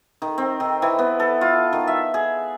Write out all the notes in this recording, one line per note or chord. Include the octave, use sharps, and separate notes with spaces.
D#3
C4
D#3
E3
B3
A4
F4
D#3
E5
G#4